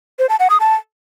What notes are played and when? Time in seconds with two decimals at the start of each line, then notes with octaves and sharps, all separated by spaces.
0.19 C5
0.29 A5
0.40 F#5
0.50 D#6
0.60 A5